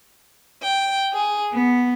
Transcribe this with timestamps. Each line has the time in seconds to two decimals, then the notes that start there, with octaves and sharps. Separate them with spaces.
0.63 G5
1.12 G#4
1.52 B3